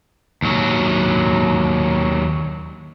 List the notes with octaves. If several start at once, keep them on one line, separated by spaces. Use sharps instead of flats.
D#2 F#3